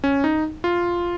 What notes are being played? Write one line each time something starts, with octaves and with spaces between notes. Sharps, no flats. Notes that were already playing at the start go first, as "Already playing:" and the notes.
C#4
D#4
F4